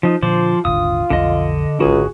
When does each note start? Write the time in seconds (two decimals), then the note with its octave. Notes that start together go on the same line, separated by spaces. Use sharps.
0.03 F3 D#4
0.22 A#2 D3 F3 C5 D5
0.65 D#1 G#1 D3 F4 D#6
1.10 B1 F2 D3 D#5
1.80 G#1 C#2 D3 F#4 G#4